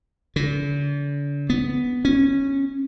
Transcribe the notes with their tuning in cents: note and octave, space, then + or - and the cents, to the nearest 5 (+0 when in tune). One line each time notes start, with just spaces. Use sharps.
D3 -40
B3 +5
C#4 -15